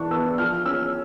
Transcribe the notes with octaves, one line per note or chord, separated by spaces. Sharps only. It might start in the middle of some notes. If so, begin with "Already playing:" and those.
Already playing: E3 D4 C#6
B3 E6
F3 F6
C#4 E6